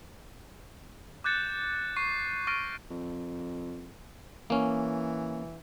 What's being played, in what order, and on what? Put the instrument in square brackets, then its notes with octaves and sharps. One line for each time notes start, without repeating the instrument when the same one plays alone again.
[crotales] D6 F#6 G6 A6 C#7 E7
C#6 C7
C#6 F6 A6 A#6 D7
[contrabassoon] F2
[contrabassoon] E3 [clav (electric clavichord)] A#3 C#4